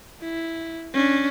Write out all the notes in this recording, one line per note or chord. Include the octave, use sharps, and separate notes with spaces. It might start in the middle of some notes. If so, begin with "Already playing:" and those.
E4
C#4 D4